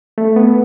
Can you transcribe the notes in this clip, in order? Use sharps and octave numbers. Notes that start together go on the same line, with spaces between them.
A3
B3